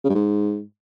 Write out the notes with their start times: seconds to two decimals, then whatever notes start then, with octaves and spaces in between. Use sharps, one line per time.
0.04 C#3
0.10 G2
0.15 G#2